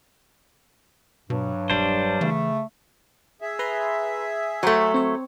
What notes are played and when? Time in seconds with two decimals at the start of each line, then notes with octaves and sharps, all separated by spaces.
1.30 G2 B2 F#3
1.70 E1 G3 D4 C5
2.21 C#3 E3 A3
3.41 G#4 E5
3.59 B4 A#5 C6
4.63 F#3 A3 F#4 C5
4.94 C4 C#5